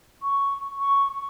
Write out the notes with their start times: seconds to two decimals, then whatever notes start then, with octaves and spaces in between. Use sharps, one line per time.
0.23 C#6
0.79 C#6